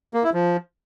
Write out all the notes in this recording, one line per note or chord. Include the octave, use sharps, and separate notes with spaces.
A#3
E4
F3